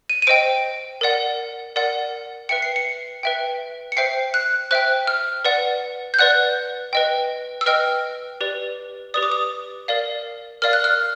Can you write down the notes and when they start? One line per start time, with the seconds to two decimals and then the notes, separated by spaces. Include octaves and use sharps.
0.09 D#7
0.22 D#7
0.27 C5 D#5 G5 D7
1.01 A#4 D5 F#5
1.76 A#4 D5 F#5
2.49 B4 E5 G5 C#7
2.62 C7
2.76 C#7
3.23 B4 E5 G5
3.92 C#7
3.97 C5 E5 G5 C7
4.34 F#6
4.71 C5 E5 G5 F#6
5.07 F6
5.45 B4 D5 F#5
6.14 G6
6.19 B4 D5 F#5 F#6
6.93 B4 D#5 G5
7.61 E6
7.66 B4 D#5 G5 F6
8.41 G4 B4 D5
9.14 G4 B4 D5 D#6
9.23 D6
9.32 D#6
9.88 A#4 D5 F5
10.62 A#4 D5 F5 F6
10.73 F#6
10.84 F6